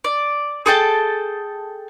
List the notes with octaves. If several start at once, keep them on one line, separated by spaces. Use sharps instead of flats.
D5
G#4 A4 G5 A5